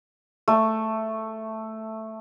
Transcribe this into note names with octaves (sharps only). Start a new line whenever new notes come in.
A3